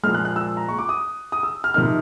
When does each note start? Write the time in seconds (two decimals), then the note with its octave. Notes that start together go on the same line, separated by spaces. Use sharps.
0.03 A#2 F3 G#3 F6
0.14 F#6
0.25 F#6
0.36 E6
0.57 A#5
0.68 C#6
0.79 D6
0.89 D#6
1.32 D#6
1.43 E6
1.64 F6
1.74 C3 F3 A#3 D#4 F6